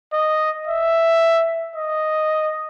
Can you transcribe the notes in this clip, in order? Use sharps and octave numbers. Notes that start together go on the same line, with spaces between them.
D#5
E5
D#5